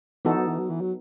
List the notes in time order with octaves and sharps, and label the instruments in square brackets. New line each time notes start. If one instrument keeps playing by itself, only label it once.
[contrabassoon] E3 [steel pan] B3 D#4 F#4 A4
[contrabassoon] F#3
E3
F#3
E3
F#3